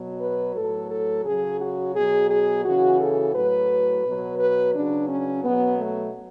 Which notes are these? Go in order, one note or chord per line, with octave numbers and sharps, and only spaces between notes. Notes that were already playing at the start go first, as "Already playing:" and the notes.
Already playing: B2 F#3
B4
A2 F#3 A4
A4
C#3 F#3 G#4
F#4
B2 F#3 G#4
G#4
C#3 E3 F#4
A4
A2 F#3 B4
B2 F#3
B4
C#3 F#3 D4
C#4
B2 F#3 B3
A3